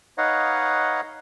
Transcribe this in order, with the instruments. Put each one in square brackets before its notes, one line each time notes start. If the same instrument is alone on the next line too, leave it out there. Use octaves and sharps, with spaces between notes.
[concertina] D#4 B4 C#5 D#5 F5 F#5